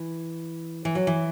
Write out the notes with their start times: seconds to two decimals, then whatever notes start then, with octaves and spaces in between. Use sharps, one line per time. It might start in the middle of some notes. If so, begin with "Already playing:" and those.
Already playing: E3
0.85 E3
0.95 F#3
1.07 E3